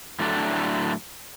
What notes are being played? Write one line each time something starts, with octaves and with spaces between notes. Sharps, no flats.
A2 D3 F#3 A3 D4 G4